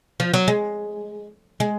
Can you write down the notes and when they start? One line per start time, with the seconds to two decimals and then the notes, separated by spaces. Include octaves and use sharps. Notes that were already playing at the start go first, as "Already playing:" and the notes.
0.20 F3
0.34 F#3
0.48 G#3
1.60 G#3